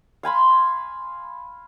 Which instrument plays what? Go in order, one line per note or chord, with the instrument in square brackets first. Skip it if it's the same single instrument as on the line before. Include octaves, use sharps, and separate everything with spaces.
[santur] F5 G#5 B5 C6